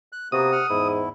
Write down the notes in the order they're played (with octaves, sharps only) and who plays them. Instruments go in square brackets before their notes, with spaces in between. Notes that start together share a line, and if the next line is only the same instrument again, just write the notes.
[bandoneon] F#6
[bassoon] C3 [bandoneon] A#3 B3 F#4 [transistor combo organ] D#6
[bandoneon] F#5 F6
[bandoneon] E2 E4 [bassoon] G#2